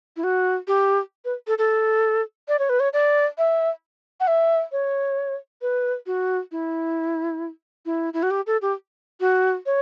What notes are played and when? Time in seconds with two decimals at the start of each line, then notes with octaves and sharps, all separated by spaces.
0.16 E4
0.24 F#4
0.68 G4
1.25 B4
1.47 A4
1.58 A4
2.48 D5
2.59 C#5
2.69 B4
2.80 C#5
2.93 D5
3.38 E5
4.20 F#5
4.27 E5
4.72 C#5
5.62 B4
6.06 F#4
6.51 E4
7.86 E4
8.13 E4
8.23 F#4
8.30 G4
8.47 A4
8.62 G4
9.20 F#4
9.66 C#5